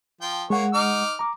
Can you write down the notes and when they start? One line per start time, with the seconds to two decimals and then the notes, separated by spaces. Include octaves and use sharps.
0.21 F3 G5
0.50 G#3 A#3 C#5 F#5
0.74 D#4 D6 F6
1.19 A#5 D6